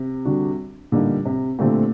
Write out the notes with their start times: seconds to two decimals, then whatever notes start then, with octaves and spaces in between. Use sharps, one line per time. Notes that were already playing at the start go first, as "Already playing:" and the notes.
Already playing: C3
0.25 D3 G3 D4 F#4
0.92 A#2 D3 G3 A#3 D#4 G4
1.25 C3
1.58 A#2 D3 A3 C4 G4